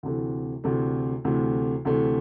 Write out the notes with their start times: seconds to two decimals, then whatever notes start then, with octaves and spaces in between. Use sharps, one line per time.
0.03 D2 C3 E3 A3
0.64 D2 C3 E3 A3
1.25 D2 C3 E3 A3
1.85 D2 C3 E3 A3